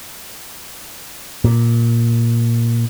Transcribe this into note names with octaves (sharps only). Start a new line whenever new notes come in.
A#2